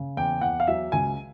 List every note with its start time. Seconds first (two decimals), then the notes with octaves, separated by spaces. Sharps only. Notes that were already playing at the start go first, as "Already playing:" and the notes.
Already playing: C#3
0.17 E2 G5
0.41 E2 F#5
0.60 F5
0.67 F#3 E5
0.92 C#2 G#5